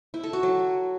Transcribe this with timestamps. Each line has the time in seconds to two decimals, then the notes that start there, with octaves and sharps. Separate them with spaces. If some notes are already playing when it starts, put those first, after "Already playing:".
0.14 E4
0.23 A4
0.33 F#4
0.43 F#3